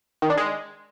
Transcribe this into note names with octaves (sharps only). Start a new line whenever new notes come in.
D#3
D4
G#3